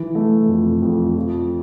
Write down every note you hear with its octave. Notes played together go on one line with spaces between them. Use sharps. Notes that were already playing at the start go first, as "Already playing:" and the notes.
Already playing: E3
A3
F2
F2
F3